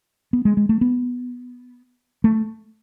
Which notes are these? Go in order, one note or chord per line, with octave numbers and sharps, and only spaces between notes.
B3
G#3
G#3
A3
B3
A3